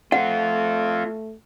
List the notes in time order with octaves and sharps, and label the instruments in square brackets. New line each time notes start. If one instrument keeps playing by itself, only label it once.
[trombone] A3 [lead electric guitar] C4 F4 [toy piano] F#5